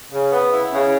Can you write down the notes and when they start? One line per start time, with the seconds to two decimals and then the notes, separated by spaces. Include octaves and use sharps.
0.11 C#3
0.31 B3
0.52 E4
0.71 C#3